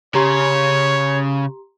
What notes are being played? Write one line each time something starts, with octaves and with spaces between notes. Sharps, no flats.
C#3 G4 C#5 A#5 C6